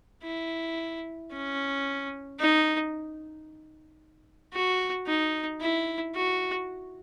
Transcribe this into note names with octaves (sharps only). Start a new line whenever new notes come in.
E4
C#4
D#4
F#4
D#4
E4
F#4